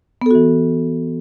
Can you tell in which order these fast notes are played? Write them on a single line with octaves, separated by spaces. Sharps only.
B3 A4 F#4 E3